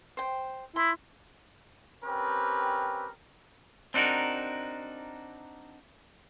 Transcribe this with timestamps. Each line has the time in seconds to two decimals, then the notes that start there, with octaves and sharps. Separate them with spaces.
0.17 C5 G5
0.76 E4 C6
2.04 C4 C#4 G4 A#4 B4
3.94 C4 D4 D#4 F#4 A#4